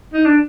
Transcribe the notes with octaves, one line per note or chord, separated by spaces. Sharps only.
D#4
D4